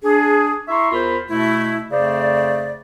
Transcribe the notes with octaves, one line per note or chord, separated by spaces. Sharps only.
D4 G#4
E4 E5 A#5 C6 C#6
E2 F4 A#4 C5 B5
B2 A3 E4
F2 C#3 A3 C5 D5